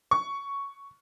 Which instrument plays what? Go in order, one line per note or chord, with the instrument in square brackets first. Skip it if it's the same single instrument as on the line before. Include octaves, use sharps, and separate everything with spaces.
[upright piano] C#6